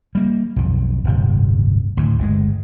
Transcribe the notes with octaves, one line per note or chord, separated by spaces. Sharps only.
G3 A#3
B1 F2
D1 G1 C3
D2 A2
G1 C3 G#3